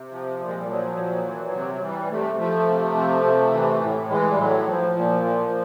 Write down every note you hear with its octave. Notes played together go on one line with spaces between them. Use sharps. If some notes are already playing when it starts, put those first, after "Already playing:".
Already playing: C3
F3
A#2
G#3
G3
F3 F#3
A#2
E3
C3
F#3
E3 G3
C3 A3
F3 A3
C3
F3
C3
E3
A2
E3 G#3
G3
A2 F#3
F3
A#2
F3